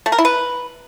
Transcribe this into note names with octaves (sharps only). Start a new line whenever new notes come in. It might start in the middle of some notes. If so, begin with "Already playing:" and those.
A3
A#4
E4
B4